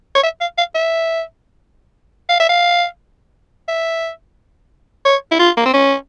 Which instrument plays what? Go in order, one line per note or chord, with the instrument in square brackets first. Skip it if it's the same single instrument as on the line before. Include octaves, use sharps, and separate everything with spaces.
[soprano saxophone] C#5
E5
F5
F5
E5
F5
E5
F5
E5
C#5
E4
F4
A#3
C4
C#4